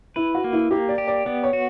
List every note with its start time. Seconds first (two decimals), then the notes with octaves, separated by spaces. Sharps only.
0.16 E4 B4
0.35 F#4
0.44 A#3
0.53 E4
0.71 A#3 G4
0.89 D5
0.98 G4
1.08 D5
1.25 B3 D5
1.43 C#5
1.53 F#4